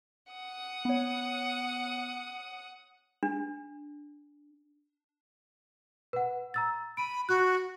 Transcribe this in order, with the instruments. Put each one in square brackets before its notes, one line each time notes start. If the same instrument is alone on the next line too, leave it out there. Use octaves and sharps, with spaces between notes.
[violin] F#5 D#6
[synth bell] B3 C#5
[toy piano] D4
[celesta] B4 F#5
A#5 E6 A6
[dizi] B5 [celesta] D7 D#7
[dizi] F#4 [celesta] F#6